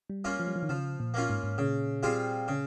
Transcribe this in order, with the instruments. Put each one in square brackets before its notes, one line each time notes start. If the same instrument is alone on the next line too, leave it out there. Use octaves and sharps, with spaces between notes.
[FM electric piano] G3
[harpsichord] A#3 C#4 F4
[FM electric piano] F3
G3
F3
D#3
[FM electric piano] C#3 [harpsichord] F3
[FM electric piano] A#2
[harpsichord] A#3 C#4 F4
[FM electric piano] G#2
G#2
[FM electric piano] A#2 [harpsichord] C#3
[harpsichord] G3 C4 F4 G#4
C#3